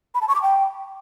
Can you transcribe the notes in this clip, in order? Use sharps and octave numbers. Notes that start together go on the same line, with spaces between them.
B5
A5
C#6
D6
G5